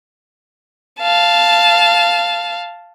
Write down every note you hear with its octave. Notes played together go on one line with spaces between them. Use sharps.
F5 A5